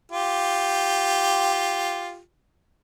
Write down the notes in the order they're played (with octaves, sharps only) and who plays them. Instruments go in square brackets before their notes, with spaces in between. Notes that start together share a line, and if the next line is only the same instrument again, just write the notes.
[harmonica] F4 G4